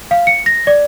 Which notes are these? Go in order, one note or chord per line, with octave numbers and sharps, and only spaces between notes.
F5
C#7
A#6
D5